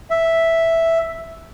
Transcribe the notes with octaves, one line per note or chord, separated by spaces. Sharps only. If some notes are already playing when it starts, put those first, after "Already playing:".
E5